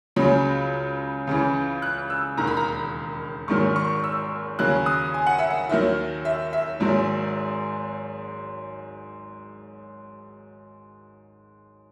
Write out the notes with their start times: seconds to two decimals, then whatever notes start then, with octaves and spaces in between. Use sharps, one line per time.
0.16 C#2 C#3 F#3 B5
1.27 C#2 C#3 E3
1.82 F#6
2.10 E6
2.37 E1 D#2 D#3 A#5
2.47 B5
2.57 A#5
3.48 G#1 G#2 D#3 F#3 C#6
3.76 C#6
4.04 E6
4.59 D#2 C#3 F#3 F#6
4.86 D#6
5.14 G#5
5.26 F#5
5.39 E5
5.50 F#5
5.69 D#2 D#3 F#3 E5
6.25 E5
6.53 E5
6.80 G#1 G#2 F#3